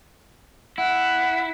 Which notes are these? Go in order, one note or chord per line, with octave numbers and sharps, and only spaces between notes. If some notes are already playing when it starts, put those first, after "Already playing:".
E4 F#5